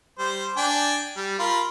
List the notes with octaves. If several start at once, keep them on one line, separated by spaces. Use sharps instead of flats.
G3 C5
D4 G5 G#5
G3
F4 A#4 B5